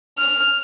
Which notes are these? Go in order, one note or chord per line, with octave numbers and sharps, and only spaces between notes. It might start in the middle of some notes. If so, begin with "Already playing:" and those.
F6